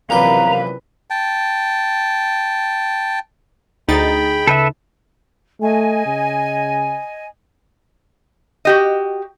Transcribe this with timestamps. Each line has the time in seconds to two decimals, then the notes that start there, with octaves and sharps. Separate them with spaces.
0.10 A#1 F#2 C3 E3 G4 B4 F5 A#5
1.10 G5 A5
3.88 D2 D#4 G#4 G5 B5 A6
4.47 C#3 A4 B4 E5
5.61 A3 D#5 G#5
6.06 C#3
8.65 F#4 G4 D#5